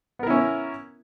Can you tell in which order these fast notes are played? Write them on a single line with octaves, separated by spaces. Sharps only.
B3 A#4 E4 C#4